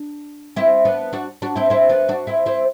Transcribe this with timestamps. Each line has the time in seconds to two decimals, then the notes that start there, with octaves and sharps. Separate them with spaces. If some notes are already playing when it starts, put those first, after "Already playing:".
Already playing: D4
0.56 C4 E4
0.85 B3 D4
1.13 D4 F#4
1.42 D4 F#4
1.56 C4 E4
1.70 C4 E4
1.89 B3 D4
2.08 D4 F#4
2.27 C4 E4
2.46 C4 E4